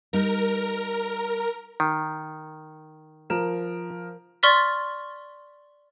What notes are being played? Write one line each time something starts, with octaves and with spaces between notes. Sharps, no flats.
G3 D#4 A#4
D#3
F3 A#4 E7
D5 C6 C#6 F6 A6 B6